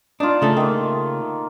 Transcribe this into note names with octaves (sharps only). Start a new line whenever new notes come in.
D4 D#4 F4
C#3 A3 A4
D#3 A#3